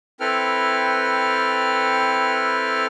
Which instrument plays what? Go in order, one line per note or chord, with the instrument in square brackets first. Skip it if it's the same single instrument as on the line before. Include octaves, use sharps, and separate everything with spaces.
[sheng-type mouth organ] C4 E4 A4 B4 G5 F6